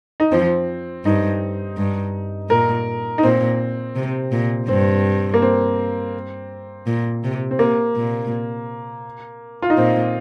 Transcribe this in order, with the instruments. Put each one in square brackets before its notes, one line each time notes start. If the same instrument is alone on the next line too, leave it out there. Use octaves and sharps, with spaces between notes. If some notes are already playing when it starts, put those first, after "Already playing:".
[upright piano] D#4
[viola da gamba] F2 F3 [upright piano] C4
[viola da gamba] G2 [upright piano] D#4
[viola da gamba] G2
[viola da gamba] A#2 [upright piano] A#4
[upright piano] D#4
[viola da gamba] A#2 [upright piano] C4
[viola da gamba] C3
A#2
[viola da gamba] G2 [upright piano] C4
[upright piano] A#3
C4
[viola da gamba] A#2
C3
[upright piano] C4
[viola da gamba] C3 [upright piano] A#3
[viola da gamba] A#2
[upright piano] F4
D#4
[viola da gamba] A#2 [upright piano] C4